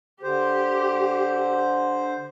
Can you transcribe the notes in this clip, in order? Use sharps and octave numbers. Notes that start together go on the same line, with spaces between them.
D3 G4 C5